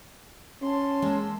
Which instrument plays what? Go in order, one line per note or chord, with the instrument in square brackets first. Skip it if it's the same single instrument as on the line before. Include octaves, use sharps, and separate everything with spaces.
[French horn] C#4 [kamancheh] A5 C6
[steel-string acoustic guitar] G#3 A#3 E5